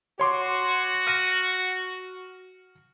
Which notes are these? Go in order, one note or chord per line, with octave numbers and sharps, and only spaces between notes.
F#4 C#5 C6 D6
F6 A#6 D#7